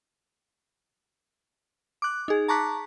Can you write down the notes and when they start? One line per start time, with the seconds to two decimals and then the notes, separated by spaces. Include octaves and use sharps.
2.02 D6 F#6
2.28 D#4 G#4
2.48 A5 A#5 C#6 D6 F#6 B6